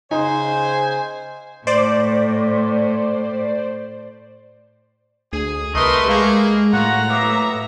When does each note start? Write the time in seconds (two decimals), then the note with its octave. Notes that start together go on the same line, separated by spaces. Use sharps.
0.11 C#3 D#4 C5 G#5
1.67 A2 C5 D5
5.33 D2 G#4
5.75 C2 A3 A#4 B4 D#5 C6
6.08 G#3 A#3 G#4
6.73 A2 F4 F#4 F#5 A#5
7.10 F#3 A#3 B3 E5